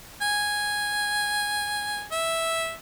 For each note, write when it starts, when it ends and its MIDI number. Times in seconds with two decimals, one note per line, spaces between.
0.22 2.03 80
2.12 2.73 76